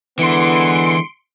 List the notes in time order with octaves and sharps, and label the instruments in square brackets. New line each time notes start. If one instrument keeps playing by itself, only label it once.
[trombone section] D3 G#3 B3 [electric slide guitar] E3 [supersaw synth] C6 C#7 D7